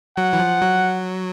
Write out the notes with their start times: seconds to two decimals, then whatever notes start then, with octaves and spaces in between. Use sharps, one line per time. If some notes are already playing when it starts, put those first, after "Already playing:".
0.17 F#3 F#5
0.33 E3
0.39 F3
0.62 F#3